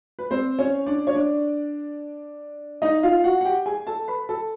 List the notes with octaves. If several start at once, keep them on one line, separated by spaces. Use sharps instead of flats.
B4
C4 C5
C#4 C#5
D4 D5
C#5
D4 D5
D#4 D#5
F4 F5
F#4 F#5
F#5
G4 G5
G#4 G#5
A4 A5
B4 B5
A4 A5